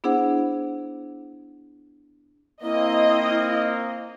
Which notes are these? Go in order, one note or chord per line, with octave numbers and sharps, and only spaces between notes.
B3 D4 E4 G#4 C5 F#5
A#3 C4 E4 D#5